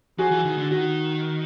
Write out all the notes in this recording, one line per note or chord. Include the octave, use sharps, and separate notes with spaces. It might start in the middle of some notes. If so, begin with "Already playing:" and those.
F3 F#4 G#4
E3
D#3
D3
D#3 F#4